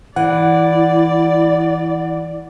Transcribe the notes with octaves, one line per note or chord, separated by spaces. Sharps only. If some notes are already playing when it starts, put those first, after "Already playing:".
E3 E4 D5 F#5